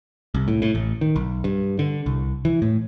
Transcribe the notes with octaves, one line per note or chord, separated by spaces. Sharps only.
C2
A2
A2
A1
D#3
B1
G2
D3
C2
E3
A2